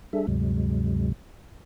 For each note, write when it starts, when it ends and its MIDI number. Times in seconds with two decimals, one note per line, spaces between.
0.13 0.26 55
0.13 0.26 62
0.13 0.26 68
0.13 0.26 69
0.13 0.26 76
0.27 1.12 38
0.27 1.12 43
0.27 1.12 48
0.27 1.12 54
0.27 1.12 56